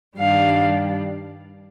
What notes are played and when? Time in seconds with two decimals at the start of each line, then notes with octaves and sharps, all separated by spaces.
0.17 G2 D#3 G3 D4 F5